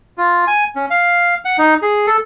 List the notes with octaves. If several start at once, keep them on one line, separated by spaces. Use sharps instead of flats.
F4
G#5
C#4
F5
F#5
D#4
G#4
A4